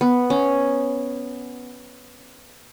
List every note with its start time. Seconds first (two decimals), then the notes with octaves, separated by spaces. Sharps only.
0.01 B3
0.30 C#4